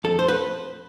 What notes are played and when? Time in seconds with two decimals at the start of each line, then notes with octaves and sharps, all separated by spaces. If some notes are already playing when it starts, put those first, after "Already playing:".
0.04 F2 A4
0.19 C5
0.28 B4